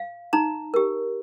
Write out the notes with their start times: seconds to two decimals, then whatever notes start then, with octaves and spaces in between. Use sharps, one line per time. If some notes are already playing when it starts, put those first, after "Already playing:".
Already playing: F5
0.33 D#4 A#5
0.74 G4 A#4